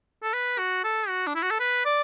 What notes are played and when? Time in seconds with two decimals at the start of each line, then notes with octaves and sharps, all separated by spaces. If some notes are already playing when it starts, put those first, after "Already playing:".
0.23 A4
0.34 B4
0.59 F#4
0.84 A4
1.08 F#4
1.27 D4
1.35 E4
1.43 F#4
1.51 A4
1.60 B4
1.85 D5